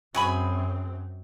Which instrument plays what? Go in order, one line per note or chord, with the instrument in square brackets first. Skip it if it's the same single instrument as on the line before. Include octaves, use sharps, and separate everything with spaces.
[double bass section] F#2 C4 [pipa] F#3 G#4 B5